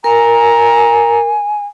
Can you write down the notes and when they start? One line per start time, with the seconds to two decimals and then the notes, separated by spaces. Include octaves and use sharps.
0.04 A#4 G#5 A#5